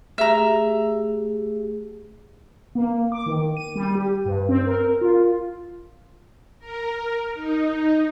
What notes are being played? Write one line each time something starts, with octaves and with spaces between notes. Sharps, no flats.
A3 G4 G#4 E5 A#5
A#3
D6
D#3
D#7
G3
G4
G2
C4
A#4
F4
A#4
D#4